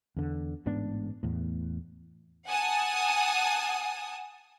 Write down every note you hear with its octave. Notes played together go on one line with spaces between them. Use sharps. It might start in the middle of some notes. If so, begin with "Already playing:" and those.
E2 D3
A1 G#2 B3 D4
E2 A2
F#5 G#5 A5 D#6